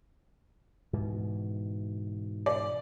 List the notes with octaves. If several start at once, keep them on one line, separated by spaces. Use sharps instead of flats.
G#2 B2 E3
D5